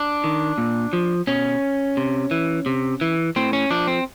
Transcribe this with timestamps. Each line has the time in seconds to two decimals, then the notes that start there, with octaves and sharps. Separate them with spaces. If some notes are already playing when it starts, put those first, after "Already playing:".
Already playing: D4
0.24 D#3
0.58 A#2
0.93 F3
1.27 B2 C#4
1.97 C3
2.31 E3
2.66 C3
3.01 E3
3.36 A2 C4
3.53 C#4
3.71 F3 D4
3.87 C4